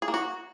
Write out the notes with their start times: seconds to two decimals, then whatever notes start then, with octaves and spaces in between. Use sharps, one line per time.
0.02 G#4
0.08 A#3
0.14 F#4